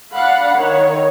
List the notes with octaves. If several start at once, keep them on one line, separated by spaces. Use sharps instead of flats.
D4 D5 F5 F#5 B5
D#3 C#5